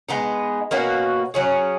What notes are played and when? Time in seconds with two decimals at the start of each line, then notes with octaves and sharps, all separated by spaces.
0.09 G#3 B3 D#4
0.71 B2 A#3 C#4 F#4
1.34 F#3 C#4 G#4